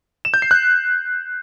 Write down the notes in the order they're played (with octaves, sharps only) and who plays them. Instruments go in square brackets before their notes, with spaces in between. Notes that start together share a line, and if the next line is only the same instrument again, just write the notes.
[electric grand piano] E7
G6
C7
F#6